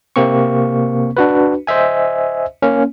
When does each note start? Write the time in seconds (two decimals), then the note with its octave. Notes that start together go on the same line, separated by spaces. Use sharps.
0.16 C3 A#3 C4 C#6
1.17 D4 F#4 B4
1.67 C5 D#5 E5 G#5
2.62 A#3 C#4